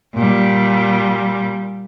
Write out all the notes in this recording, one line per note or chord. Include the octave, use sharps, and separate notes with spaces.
A#2 G3